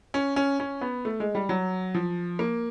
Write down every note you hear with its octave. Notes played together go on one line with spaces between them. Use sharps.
C#4
C#4
C#4
B3
A3
G#3
G3
F#3
F3
A#3